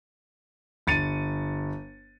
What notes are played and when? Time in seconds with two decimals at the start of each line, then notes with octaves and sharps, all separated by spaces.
0.87 G1 A6 C#7 D#7